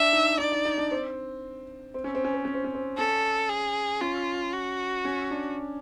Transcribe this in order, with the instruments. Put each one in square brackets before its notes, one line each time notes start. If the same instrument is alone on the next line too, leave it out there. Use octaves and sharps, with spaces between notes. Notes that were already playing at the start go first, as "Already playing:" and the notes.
Already playing: [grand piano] D4 [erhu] E5
[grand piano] D#4
[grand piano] D#4 [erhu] D5
[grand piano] D#4
D#4
D4
C4
C4
C#4
C4
C#4
C4
C#4
C4
C#4
C4
[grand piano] C#4 [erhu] A4
[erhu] G#4
[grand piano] C#4 [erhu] F4
[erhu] F#4
[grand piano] C#4
D4